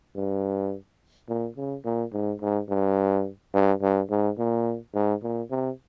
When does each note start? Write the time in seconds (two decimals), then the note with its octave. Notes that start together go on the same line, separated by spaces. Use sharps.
0.16 G2
1.29 A#2
1.57 C#3
1.85 A#2
2.13 G#2
2.41 G#2
2.69 G2
3.53 G2
3.82 G2
4.10 G#2
4.38 A#2
4.94 G#2
5.23 A#2
5.50 C3